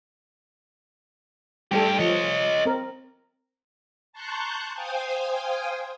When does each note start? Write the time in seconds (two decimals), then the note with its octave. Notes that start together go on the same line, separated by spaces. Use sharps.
1.71 G2 G3 A3 G4 A4
1.99 F3 C#5 D#5
2.65 C4 A#4
4.13 A5 A#5 C6 C#6 F#6 G6
4.74 C5 F5 G5 G#5 D#6